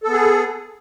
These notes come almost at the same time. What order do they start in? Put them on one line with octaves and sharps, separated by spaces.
A4 B3 G#4